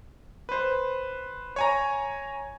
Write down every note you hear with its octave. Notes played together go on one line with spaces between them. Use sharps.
B4 C5
C#5 G#5 A#5